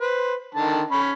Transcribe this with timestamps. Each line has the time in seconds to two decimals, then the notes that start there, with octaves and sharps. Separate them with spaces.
0.01 B4 C5
0.55 D3 D#3 A5
0.91 C#4 B5